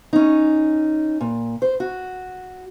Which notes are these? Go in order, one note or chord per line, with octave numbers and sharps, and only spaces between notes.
C#4 D#4
A#2
C5
F#4